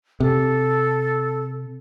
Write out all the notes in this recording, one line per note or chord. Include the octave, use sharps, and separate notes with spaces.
C3 A4